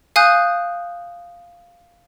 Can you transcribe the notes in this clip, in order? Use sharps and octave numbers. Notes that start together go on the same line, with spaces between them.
F5 G#5 D#6 F#6 G6